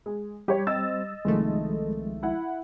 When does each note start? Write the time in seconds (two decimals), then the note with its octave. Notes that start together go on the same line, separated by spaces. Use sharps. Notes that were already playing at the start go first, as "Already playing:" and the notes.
0.06 G#3
0.48 G3 G4 C#5
0.67 C4 D#5 E6 A6
1.25 C2 D#3 F3 G#3 A3
2.23 E4 F#5